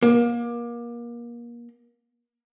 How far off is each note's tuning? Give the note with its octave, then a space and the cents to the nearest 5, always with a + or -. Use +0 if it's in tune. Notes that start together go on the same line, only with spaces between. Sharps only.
A#3 +30